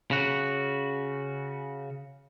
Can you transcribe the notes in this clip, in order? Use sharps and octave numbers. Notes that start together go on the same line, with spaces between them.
C#3 F#4